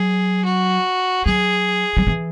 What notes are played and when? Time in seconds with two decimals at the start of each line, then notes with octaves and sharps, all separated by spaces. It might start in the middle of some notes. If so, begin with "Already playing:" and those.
Already playing: F#3 G#4
0.45 F#4
1.26 F#3 G#4
1.97 F#3
2.07 E3